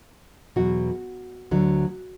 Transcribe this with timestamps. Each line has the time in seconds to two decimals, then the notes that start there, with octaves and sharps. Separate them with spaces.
0.56 E2 B2 F#3 F#4
1.51 D2 D3 F#3